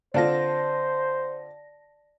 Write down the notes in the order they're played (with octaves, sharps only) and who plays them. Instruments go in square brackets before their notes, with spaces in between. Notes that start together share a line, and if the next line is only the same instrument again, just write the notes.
[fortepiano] D3 C4 F4 [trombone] C5 [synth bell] D5 A5 A#6